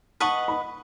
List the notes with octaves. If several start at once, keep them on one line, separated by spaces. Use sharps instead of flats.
B4 D#5 F#5 A5 C#6
B5